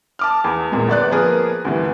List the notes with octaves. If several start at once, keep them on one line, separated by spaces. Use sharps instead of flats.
A5 D6 F6
E2
E2 A#2 G#3
G1 B4 D5 F#6
F3 A#3 B3 G#4 A#4 B4
D2 G2 E3